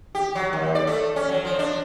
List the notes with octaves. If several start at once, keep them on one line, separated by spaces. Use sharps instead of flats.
G4
F#3
D#2
D5
A3
C#4
F#3
F3
D4